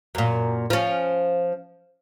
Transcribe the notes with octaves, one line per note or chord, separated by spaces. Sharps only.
F#2 A#2
F3 C#4